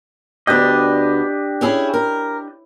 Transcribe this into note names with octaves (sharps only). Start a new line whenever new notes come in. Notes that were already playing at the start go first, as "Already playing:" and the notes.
D2 B3 D4 G4 D#5
C#4 E4 G#4
A#4